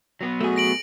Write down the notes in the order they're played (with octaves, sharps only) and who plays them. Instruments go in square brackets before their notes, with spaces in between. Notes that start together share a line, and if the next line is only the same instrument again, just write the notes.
[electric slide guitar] F#3 B3
[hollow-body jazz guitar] A3 G#4 [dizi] F#4
[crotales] A#6 D7 F#7